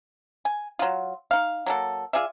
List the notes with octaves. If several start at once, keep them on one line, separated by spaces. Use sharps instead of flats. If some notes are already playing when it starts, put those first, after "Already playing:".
G#5
F#3 F4
D#4 F5
F#3 A#3 A4
F4 G#4 D5 E5